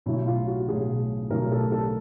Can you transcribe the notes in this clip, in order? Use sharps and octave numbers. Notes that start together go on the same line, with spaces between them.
B1 A2 F#3 E4
F4
F#4
B1 A2 F#3 G#4
B1 A2 F#3 A#4
A4
A4